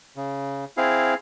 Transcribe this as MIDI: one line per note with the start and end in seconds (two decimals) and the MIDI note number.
0.16 0.65 49
0.77 1.14 60
0.77 1.14 64
0.77 1.14 68
0.77 1.14 77